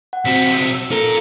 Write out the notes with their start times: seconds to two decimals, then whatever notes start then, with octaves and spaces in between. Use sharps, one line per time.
0.13 F#5
0.25 B1 C4 F#4 B6
0.75 E6
0.91 F4 A4 A#4